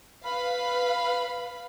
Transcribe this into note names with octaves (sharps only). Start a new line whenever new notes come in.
B4 F5 B5